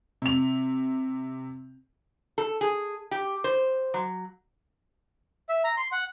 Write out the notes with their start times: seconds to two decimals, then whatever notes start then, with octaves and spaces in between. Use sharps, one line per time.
0.22 C3 F7
2.38 A4
2.61 G#4
3.11 G4
3.44 C5
3.94 F#3
5.49 E5
5.64 A#5
5.77 C6
5.92 F#5